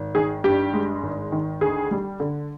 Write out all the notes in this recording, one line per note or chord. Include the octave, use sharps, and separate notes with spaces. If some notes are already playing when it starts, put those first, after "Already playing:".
Already playing: G#1
D#3 G#4
G2 G4
G#3
G#1
D#3
D2 G#4
G3
D3